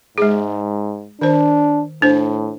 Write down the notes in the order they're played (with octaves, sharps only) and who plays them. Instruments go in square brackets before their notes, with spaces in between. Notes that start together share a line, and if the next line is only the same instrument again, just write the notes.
[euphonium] G#2 [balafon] G#3 G#4
[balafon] D#3 C5 [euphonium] D4
[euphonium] A2 [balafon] D4 C5